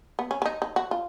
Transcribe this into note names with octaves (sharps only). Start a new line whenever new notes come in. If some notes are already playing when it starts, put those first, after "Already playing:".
B3
C#4
C#4
D#4
D#4
F#4
F4